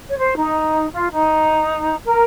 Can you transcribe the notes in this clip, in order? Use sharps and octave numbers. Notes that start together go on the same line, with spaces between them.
C#5
C5
D#4
F4
D#4
A#4